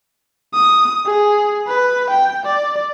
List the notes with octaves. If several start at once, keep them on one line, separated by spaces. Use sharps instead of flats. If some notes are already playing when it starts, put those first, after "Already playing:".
D#6
G#4
B4
G5
D5